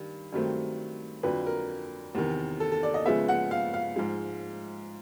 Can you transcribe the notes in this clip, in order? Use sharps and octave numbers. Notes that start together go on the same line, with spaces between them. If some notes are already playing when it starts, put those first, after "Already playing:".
Already playing: G2 D#3
G2 D#3 F#3 A3 C4
F2 D3 F#3 B4
A#4
E2 C3 D#3
A4
A4
D5
D#5
C#3 F3 G#3 B3 E5
F#5
F5
F5
G#2 F3 G#3